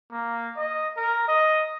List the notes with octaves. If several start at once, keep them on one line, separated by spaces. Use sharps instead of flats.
A#3
D#5
A#4
D#5